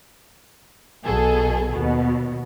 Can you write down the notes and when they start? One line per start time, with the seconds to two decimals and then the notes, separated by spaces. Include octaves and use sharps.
1.04 B1 B2 G#4 A4
1.72 D#2 B2